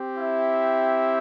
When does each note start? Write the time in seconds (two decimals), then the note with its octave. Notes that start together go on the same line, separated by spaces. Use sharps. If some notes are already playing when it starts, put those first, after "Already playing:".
Already playing: C4 G4
0.17 E4 E5